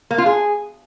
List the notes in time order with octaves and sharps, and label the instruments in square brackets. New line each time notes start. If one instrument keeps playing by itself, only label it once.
[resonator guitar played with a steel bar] A#3
F4
G#4